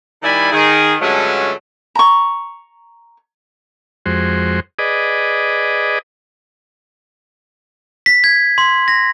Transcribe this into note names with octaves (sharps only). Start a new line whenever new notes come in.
D#3 G3 E4 D5 G#5 B5
D#3 G#4
G2 D3 F#3 G#3 A3 C#4
A#5 C#6
F2 G#3 F#4 C5
G#4 B4 D5 D#5
B6
G#6
C6
A#6